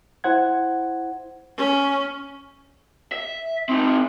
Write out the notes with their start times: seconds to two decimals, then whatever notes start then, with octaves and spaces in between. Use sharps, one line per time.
0.24 E4 C5 F#5 G#6
1.58 C#4
3.12 E5
3.69 C4 D#4